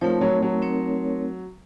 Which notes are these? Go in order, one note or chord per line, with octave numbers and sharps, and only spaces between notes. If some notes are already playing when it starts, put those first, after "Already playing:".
F3 A3 C4 D#4 A#4 C#5
F#3
F#3
A3 C4 D#4 A#4 C#5